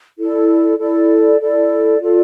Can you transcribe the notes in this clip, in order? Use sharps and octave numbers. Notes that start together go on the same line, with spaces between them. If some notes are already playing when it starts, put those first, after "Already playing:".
E4 A4 D5
E4 A4 D5
E4 A4 D5
F4 A4 D5